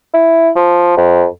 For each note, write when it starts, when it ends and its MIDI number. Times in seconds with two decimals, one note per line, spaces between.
0.14 0.50 64
0.56 0.95 53
0.97 1.26 41